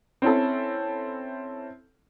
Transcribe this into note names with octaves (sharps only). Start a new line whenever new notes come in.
C4 C#4 E4 A4